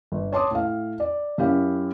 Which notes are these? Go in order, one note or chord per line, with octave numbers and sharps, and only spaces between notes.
G1
C#5 A5 C6 D6 D#6
A2 F5
D5
F#2 C#4 E4 G4 F5